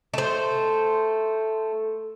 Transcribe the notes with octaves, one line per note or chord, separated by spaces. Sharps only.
A3 C5